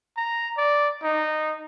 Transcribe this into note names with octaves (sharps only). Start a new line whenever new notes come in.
A#5
D5
D#4